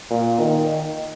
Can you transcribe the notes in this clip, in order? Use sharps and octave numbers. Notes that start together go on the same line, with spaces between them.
A#2
D#3